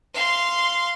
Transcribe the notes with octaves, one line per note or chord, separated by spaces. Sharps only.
F5 C6